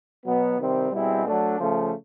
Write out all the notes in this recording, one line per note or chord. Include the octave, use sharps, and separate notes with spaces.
B2 F#3 B3
C3 D#3 G3 C4
B2 G3 C4 E4 G#4
F#3 A3 D4
C#3 F3 A3